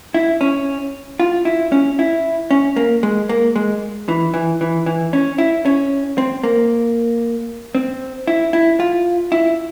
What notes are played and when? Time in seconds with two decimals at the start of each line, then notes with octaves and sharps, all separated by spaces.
0.14 E4
0.41 C#4
1.20 F4
1.45 E4
1.72 C#4
1.99 E4
2.51 C#4
2.76 A#3
3.03 G#3
3.29 A#3
3.56 G#3
4.08 E3
4.34 E3
4.61 E3
4.86 E3
5.13 C#4
5.38 E4
5.66 C#4
6.18 C4
6.43 A#3
7.75 C4
8.27 E4
8.53 E4
8.80 F4
9.32 E4